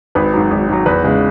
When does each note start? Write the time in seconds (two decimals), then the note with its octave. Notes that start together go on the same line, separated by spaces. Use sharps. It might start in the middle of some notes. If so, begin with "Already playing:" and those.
0.15 G#1 B4
0.33 G#2 F#3
0.51 G#1
0.69 G#2 F#3
0.86 E2 B4
1.04 C#3 G#3